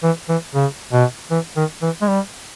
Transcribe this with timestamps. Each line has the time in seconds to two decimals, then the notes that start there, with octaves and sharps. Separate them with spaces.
0.03 E3
0.29 E3
0.55 C#3
0.93 B2
1.31 E3
1.57 D#3
1.82 E3
2.02 G#3
2.08 G3